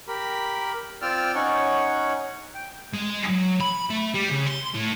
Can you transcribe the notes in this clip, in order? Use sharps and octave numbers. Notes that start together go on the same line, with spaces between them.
G4 A#4 B5
C4 F4 D5 G5 E6 F6
C#4 D#4 C#5 F#5
G5
G#3
F#3
B5
A3
G3
C#3
C6
A2